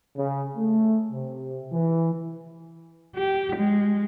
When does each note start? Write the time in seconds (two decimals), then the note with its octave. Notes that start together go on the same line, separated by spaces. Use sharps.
0.16 C#3
0.55 A3
1.11 C3
1.71 E3
3.16 G4
3.56 G#3